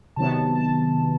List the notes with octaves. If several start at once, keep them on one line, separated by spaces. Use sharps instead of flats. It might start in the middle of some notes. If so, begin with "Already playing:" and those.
C3 D#3 F#3 B3 A5
A5